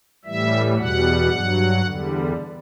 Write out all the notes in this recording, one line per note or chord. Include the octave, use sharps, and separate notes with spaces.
A2 E3 G3 E5
E2 B2 G3 F#5
G2 F#3
E2 D3 G3